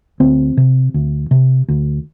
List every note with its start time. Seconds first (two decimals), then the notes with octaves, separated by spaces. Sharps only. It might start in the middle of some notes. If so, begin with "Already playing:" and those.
0.20 D2 C4
0.57 C3
0.94 D2
1.31 C3
1.68 D2